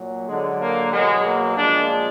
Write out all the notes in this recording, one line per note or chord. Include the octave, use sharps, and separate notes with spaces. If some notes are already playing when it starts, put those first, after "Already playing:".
Already playing: A#2 F#3
D3 F#3 G#3
A#3
B2 F#3 G#3
A#3
A#2 F3 G#3 D4